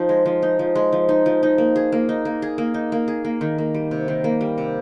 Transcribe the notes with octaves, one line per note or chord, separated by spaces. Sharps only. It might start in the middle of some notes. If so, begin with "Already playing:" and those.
Already playing: F3 D#4
G#3
F3
D#4
F3
G#3
F3
D#4
F3
D#4
A#3
G#4
A#3
D#4
A#3
G#4
A#3
D#4
A#3
G#4
A#3
D#3
A#3
G3
C3
D#3
A#3
G3
C3